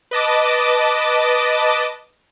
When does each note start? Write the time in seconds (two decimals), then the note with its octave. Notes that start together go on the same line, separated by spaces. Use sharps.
0.11 B4 D#5 A5 D6